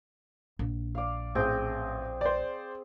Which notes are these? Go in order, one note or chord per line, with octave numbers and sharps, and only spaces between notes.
A#1
D5 F5
A1 C4 G#4 G5
C5 D5